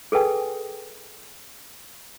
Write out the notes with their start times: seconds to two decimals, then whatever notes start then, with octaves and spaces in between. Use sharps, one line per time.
0.12 G#4 A4 B4 G5 G#5